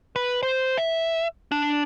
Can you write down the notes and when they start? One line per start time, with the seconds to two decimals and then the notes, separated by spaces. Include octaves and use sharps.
0.16 B4
0.43 C5
0.78 E5
1.52 D4